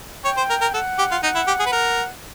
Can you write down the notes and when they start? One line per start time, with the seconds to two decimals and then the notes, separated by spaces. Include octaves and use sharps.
0.25 C#5 G5
0.37 C5
0.50 A#4
0.61 A#4
0.74 A4 F#5
0.98 G4
1.11 F4
1.23 D#4 F#5
1.35 E4
1.47 G4
1.60 G#4
1.66 B4
1.72 A#4